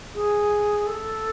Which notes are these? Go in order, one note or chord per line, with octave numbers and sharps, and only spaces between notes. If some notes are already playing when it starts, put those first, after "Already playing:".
G#4
A4